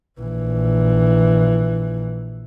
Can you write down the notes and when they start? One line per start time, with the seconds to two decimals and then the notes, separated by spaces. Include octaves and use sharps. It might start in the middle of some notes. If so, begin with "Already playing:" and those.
0.21 A#1 E3